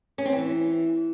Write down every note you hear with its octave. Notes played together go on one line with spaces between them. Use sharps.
C#4
C4
E3